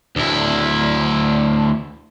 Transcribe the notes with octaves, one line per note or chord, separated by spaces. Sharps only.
D2 E4